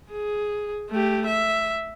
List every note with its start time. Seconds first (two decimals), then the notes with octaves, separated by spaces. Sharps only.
0.11 G#4
0.90 A3 G4
1.26 E5